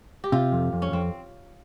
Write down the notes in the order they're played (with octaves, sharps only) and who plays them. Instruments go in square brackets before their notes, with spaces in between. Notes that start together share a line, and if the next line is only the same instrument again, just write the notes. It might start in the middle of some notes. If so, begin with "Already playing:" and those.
[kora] G4
[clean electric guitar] C3 [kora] F4
[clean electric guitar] F2
F2
[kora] C#4
[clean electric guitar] F2 [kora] C4